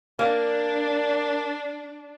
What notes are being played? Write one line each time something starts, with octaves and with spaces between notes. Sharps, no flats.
A#3 D4